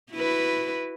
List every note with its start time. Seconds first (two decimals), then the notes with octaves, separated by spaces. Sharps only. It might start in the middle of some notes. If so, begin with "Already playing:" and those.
0.11 E4 F#4 B4